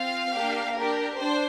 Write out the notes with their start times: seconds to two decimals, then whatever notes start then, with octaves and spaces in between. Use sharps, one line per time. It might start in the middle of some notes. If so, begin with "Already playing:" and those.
Already playing: C4 F4 F5
0.34 A#3 D4 G4
0.76 D4 G4 A#4
1.18 D4 C5